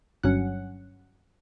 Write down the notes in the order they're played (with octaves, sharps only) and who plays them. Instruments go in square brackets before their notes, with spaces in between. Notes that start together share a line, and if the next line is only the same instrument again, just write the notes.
[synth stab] G1 G2 F#3 C#4 F#5